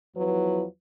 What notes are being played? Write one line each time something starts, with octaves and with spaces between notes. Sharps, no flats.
E2 F3 F#3 E4 B4